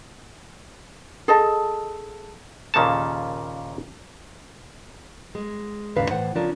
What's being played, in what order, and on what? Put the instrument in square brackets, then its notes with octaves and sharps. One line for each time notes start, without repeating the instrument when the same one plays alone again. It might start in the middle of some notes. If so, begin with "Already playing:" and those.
[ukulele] G#4 A4 D#5 A5
[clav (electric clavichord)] D#2 A#2 C#3 A#3 A4 A5
[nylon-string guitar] G#3
D#2 G#2 C#3 D4 B4 F5
A2 E3 C5 F#5
C#3 F3 C#4 D4 F4 A#4